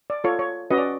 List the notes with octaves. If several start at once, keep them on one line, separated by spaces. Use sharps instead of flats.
D5
F4 A4 C#5
C#5
C#4 F#4 B4 D#5
D5